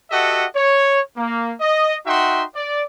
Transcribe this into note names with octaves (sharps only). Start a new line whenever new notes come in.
F#4 G4 A4 D#5 E5 F#5
C#5
A#3
D#5
D#4 F#4 E5 F#5 G5 C6
D5